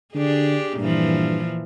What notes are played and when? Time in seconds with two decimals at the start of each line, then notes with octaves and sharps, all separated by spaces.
0.15 D3 D4 G4 G#4
0.77 G2 A#2 E3 F3